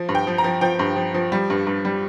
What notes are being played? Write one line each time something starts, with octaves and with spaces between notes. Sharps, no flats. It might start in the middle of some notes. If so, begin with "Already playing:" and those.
Already playing: F3
G2
G5
F3
A#5
F3
F3 G5
G2
F3
F3
G3
G2
G2
G3